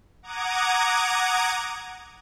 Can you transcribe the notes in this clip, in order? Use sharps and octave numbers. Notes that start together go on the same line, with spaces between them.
F#5 A#5 D6 D#6 G#6